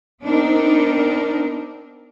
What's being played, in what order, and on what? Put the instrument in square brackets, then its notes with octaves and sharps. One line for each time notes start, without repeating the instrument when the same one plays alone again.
[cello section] B3 C4 D4 D#4 A#4